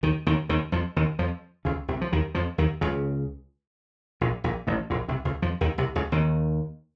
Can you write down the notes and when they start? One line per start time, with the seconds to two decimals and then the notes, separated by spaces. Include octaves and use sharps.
0.03 D#2 D#3
0.27 D#2 D#3
0.49 D#2 D#3
0.72 F2 F3
0.96 D#2 D#3
1.19 F2 F3
1.65 C#2 C#3
1.88 C2 C3
2.01 F3
2.12 D#2 D#3
2.35 F2 F3
2.58 D#2 D#3
2.81 C#2 C#3
4.21 A#1 A#2
4.44 A#1 A#2
4.67 A1 A2
4.90 A#1 A#2
5.08 C2 C3
5.25 C#2 C#3
5.42 F2 F3
5.61 D#2 D#3
5.78 C2 C3
5.95 C#2 C#3
6.12 D#2 D#3